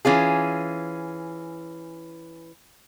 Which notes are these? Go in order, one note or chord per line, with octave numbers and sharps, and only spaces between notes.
E3 C#4 F4 G#4